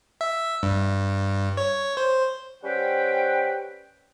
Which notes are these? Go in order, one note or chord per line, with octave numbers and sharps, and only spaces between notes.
E5
G2
C#5
C5
G3 C#4 B4 C5 F#5 G5